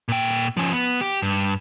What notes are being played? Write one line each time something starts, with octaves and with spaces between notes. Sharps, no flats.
A#2 G5
F3 C#4
B3
G4
G2